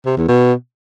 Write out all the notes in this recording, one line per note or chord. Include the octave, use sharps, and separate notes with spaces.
C3
E2
B2